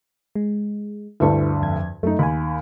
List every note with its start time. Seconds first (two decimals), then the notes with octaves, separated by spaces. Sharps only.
0.36 G#3
1.20 D2 G2 D3 E4 B4 C#6
1.62 F2 G#6
2.03 F#2 A3 D#4
2.19 D#2 G#5 B5